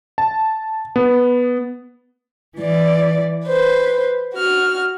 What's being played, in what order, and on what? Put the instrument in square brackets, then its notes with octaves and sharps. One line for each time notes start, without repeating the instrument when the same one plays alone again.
[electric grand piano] A5
B3
[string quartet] E3 D5
B4 C5
F#4 F6